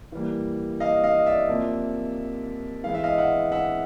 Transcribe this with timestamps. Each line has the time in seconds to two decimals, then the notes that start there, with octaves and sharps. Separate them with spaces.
0.12 E3 G3 A#3
0.80 D#5 F5
1.04 D#5 F5
1.26 D5 E5
1.49 C3 F3 A#3
2.83 E3 G#3 B3 F5
2.94 E5
3.04 D#5 F5
3.18 E5 F#5
3.52 E5 F#5